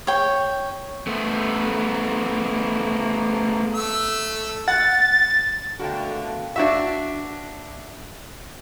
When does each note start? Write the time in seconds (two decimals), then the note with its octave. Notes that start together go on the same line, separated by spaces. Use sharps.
0.07 C#5 G5
1.07 A3 B3
3.75 A3 E6
4.68 F#5 A6
5.79 B2 D3 A3 F#4 A#4 F5 G5
6.56 D4 F#4 E5